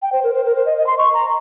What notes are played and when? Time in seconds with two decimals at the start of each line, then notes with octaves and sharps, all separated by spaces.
0.02 G5
0.13 C5
0.24 A#4
0.34 C5
0.45 A#4
0.56 C5
0.66 D#5
0.77 D#5
0.87 C6
0.98 C#6
1.14 A#5